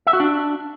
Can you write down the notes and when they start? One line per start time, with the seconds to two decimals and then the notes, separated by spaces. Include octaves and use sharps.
0.07 E5
0.13 F#4
0.20 D4